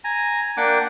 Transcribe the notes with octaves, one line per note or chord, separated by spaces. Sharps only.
G#5 A#5
A#3 D4 F#5 G5 D6